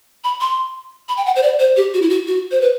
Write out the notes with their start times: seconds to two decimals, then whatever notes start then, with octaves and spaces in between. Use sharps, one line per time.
0.24 B5
0.41 C6
1.09 B5
1.17 G5
1.26 F#5
1.36 C5
1.43 D5
1.59 C5
1.77 G4
1.94 F#4
2.02 E4
2.10 F#4
2.27 F#4
2.51 C5
2.61 B4